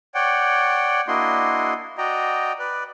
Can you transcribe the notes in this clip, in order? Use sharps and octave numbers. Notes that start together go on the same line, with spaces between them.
C#5 D5 F#5 G5
A#3 D4 E4 F#4 D#5 C6
F#4 D5 D#5 G5 A#5
B4 D5